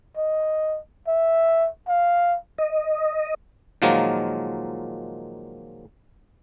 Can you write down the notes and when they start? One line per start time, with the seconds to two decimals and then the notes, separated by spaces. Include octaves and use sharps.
0.17 D#5
1.08 E5
1.88 F5
2.58 D#5
3.82 A#2 D#3 F3 F#3 G#3 A#3